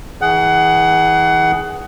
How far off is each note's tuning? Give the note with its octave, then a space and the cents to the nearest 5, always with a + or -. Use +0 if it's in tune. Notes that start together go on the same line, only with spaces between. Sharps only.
E3 -35 G#4 +0 F#5 +20